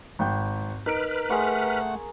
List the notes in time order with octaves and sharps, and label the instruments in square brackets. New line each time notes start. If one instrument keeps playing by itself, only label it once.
[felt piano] G#1 G5 G6
[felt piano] D#4 D7 [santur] A#4 [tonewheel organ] B4 F6
[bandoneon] A3 F#5 [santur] G#4 C6 C#6